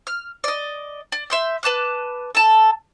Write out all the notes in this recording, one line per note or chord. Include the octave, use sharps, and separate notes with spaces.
F6
D5 D#5
D5
E5 C6 G6
B4 A5 D6 F#6
A4 A5